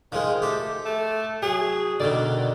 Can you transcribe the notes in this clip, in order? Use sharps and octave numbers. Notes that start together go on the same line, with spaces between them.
D#3 F3 G#3
A3 G4
A3
F#3 G#4
D2 B2 D#3 D5